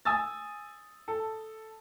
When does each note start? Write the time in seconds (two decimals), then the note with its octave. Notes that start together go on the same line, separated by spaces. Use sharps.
0.05 G#5 D#6 E6 A6
1.08 A4